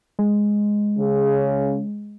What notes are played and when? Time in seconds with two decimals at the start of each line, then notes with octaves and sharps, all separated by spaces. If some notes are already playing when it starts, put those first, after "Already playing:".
0.19 G#3
0.99 C#3